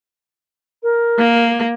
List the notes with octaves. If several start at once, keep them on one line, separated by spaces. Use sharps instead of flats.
A#4
A#3